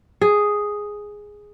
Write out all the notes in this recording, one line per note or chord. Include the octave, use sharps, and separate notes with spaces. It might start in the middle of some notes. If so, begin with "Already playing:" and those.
G#4